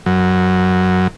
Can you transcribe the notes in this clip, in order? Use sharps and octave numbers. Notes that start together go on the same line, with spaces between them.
F#2